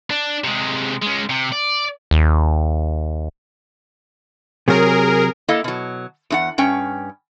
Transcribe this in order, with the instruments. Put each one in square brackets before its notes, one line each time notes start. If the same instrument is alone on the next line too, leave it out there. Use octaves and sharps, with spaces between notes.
[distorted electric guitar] D4
C3 G#3
G#3 C#4
C3
D5
[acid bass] D#2
[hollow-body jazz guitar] C3 F#3 [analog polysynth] G#4 A#4
[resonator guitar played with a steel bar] A#3 E4 A4 D#5 F5
B2 F#3
E2 D#4 F#5
G2 C#4 G5